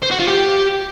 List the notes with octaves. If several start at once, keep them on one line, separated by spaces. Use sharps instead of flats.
C5
F#4
F4
G4